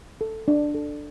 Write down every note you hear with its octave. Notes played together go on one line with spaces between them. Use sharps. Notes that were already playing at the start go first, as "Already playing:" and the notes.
A4
D4
A4